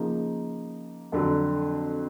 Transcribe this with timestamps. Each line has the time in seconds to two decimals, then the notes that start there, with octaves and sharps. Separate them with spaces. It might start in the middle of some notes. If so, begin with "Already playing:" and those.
Already playing: C#3 F3 A#3 D#4
1.12 F2 D3 F#3